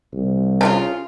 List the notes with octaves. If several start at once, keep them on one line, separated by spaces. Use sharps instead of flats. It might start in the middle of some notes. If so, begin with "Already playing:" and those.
C2
C#3 D4 F4